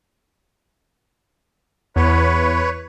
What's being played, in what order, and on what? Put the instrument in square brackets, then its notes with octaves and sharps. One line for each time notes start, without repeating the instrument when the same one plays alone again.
[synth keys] E2 [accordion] B4 C#5